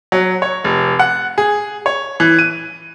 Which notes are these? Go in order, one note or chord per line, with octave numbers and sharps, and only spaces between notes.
F#3
C#5
F1
F#5
G#4
C#5
E3
D#7